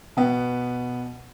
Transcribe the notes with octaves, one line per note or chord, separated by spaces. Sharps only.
B2 B3